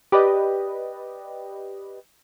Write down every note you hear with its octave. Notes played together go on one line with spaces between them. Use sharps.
G4 B4 D5 D#5